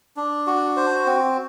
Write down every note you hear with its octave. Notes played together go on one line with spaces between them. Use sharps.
D4
F#4
C5
C4